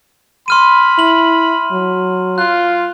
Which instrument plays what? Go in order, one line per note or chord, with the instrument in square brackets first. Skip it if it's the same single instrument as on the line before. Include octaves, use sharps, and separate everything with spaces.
[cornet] B5 [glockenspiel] C6 F6 D#7
[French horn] E4 [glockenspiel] F#7
[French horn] F#3
[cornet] F4 [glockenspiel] F#6